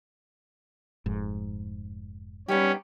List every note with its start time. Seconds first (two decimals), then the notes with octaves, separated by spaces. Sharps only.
1.06 F1 G#2
2.48 G3 B3 C#4 D#4 G4